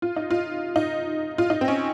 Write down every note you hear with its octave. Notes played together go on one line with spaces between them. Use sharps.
F4
D#4
F4
D#4
F4
D#4
C4
C#4